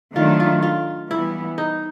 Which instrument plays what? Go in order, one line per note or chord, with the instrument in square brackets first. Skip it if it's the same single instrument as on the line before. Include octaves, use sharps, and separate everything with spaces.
[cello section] D#3 F#3 A3 D4 [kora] F4
[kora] F4
F4
[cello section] E3 G3 B3 [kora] E4
[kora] D#4